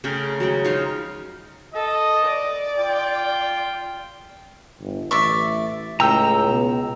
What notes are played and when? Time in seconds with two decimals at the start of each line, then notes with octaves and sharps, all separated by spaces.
0.04 C#3 A3 A#4 G5
0.40 F#3 G#3 G5
0.65 F3 D#4 F4 C#5
1.75 A4 D#5
2.25 D5
2.78 F4 G5
4.81 G1
5.11 A1 D5 E5 C#6
6.00 C#2 A2 G5 A#5 E6
6.47 B2